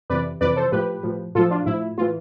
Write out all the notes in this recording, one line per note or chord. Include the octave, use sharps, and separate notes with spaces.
F2 C3 E3 B4 D5
F2 C3 E3 B4 D5
A4 C5
A2 F3 G4 B4
A2 F3
A2 F3 F4 A4
D4 F4
A2 F3 E4
A2 E3 F4